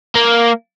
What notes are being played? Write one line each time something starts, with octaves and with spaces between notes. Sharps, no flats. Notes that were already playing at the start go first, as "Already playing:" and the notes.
A#3